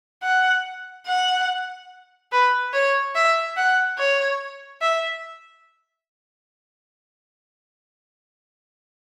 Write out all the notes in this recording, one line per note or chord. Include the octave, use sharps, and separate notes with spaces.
F#5
F#5
B4
C#5
E5
F#5
C#5
E5